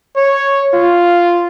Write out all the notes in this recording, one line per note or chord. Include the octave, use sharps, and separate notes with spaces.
C#5
F4